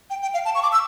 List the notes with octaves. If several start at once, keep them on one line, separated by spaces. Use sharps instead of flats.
G5
G5
F5
A5
C#6
D6
E6